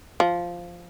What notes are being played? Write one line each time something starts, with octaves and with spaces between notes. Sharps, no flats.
F3